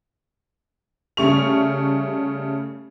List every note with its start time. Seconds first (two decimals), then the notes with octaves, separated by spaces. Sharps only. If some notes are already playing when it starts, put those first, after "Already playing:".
1.17 C#3 G3 A3 C#6 F7